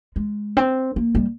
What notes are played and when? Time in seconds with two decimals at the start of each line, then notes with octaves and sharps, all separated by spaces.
0.16 G#3
0.57 C4
0.96 A#3
1.15 G3